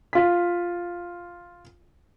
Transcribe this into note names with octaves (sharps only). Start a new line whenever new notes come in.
F4 B6